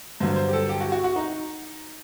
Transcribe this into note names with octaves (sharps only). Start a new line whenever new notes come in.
G2 D3 F#3 C5
C5
G4
A4
G4
F#4
F#4
F#4
D#4